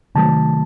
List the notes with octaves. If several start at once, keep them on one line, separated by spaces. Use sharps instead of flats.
C3 D#3 F#3 A3 A5